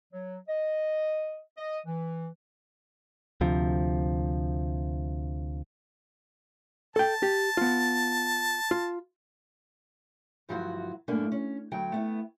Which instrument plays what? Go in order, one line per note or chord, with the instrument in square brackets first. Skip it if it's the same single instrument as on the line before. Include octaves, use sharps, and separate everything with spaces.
[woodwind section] F#3
D#5
D#5
E3
[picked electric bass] D2 C3 F3
[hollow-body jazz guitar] A4 G5 [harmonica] A5
[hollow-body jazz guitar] G4
B3 F4
F4
[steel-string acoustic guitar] D2 G2 F3 F#3 E4 F#4
F#2 A2 A3 A#3 D4
C#4
D2 F#3 G5
A3 B3 E4